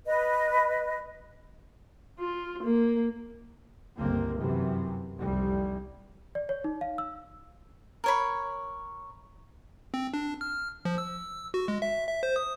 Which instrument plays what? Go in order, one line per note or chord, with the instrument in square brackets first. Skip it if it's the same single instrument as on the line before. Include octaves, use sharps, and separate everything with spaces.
[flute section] B4 D#5
[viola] F4
A#3
[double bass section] G1 C#2 A#3 C4
F#2 C3 E3
F1 C2 G3
[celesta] D5
C#5
D#4
F5
E6
[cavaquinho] A#4 C#5 B5
[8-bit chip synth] C4
D4
F6
F3
E6
F#4
G#3
E5
E5
C5
D#6